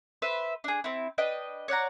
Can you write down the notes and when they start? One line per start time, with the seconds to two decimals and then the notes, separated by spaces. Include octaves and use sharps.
0.22 B4 C5 E5
0.64 D4 G#4
0.84 C4 E4
1.18 D4 B4 D#5 G5
1.68 C#5 D5 F#5 A#5